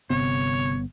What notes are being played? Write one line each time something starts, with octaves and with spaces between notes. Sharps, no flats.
G1 C3 B3 C#5